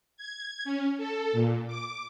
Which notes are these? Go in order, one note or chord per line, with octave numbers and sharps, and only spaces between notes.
G#6
C#4
A4
A#2
D6